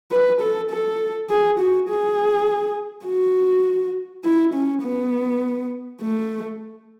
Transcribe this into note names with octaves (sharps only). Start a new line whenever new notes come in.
B4
A4
A4
G#4
F#4
G#4
F#4
E4
C#4
B3
A3